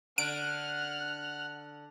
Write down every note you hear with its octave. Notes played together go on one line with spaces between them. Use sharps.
D3 F#5 F6 F#6 D7